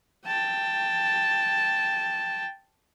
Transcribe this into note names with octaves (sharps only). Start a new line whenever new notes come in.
G5 A5